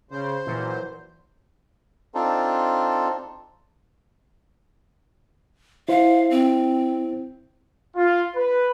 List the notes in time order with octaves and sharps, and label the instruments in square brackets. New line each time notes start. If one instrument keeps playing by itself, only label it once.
[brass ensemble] C#3 [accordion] C5
[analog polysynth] A#2 [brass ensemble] E3 F#3
[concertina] C4 D4 D#4 F4 A4
[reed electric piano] E4 C5 [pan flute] F5
[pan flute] C4
[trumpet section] F4
B4